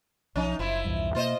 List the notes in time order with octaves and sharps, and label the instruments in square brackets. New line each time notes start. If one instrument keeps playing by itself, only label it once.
[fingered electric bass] B1 F3 [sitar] C#4 D#4
[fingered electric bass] F#1 [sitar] F3 E4
[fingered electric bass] B1 E2 G2
[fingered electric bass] B2 A#3 [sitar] F4 C5 D#5